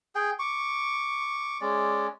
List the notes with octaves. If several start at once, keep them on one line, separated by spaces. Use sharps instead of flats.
G#4 G5
C#6 D6
G#3 C#4 D5